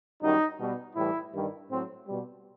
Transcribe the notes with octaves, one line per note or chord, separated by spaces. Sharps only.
F#2 D#3 G3 D#4
B2 G3
A2 E3 G3 E4
G2 D#3 G3
A2 F#3 C4
B2 G3